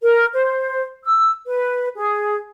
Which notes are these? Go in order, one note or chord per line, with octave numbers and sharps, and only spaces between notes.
A#4
C5
E6
B4
G#4